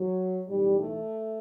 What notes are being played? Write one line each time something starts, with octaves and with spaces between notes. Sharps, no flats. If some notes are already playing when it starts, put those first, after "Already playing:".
Already playing: F#3
B1 A2 E3 G3
A3